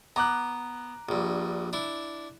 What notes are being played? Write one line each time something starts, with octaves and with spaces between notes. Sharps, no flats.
B3 A#5 D6 F#6
A#1 G2
D4 E4